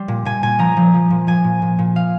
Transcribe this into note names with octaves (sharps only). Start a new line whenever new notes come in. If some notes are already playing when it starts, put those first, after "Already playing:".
Already playing: G3 C6
A#2
A#2 G#5
A#2 G#5
F3 A#5
F3
F3
A#2
F3 G#5
A#2
A#2
A#2
F3 F5